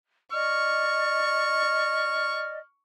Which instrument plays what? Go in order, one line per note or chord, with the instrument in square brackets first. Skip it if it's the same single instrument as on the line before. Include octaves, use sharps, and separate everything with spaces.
[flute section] D5 D#5 [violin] C#6 [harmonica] F6